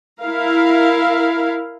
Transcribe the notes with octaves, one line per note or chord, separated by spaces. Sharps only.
E4 A#4 F5